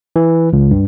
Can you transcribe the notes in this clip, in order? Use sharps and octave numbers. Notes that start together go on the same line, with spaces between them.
E3
C#2
G2